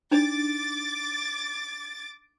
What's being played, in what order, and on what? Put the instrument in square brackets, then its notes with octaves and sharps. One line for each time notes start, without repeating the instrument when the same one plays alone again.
[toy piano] D4 D#4 D5 [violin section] D6 A6